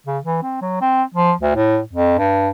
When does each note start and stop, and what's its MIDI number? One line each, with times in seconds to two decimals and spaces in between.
0.07 0.18 49
0.24 0.41 52
0.43 0.61 60
0.62 0.78 54
0.82 1.03 60
1.15 1.32 53
1.41 1.55 38
1.56 1.79 45
1.93 2.17 41
2.19 2.49 43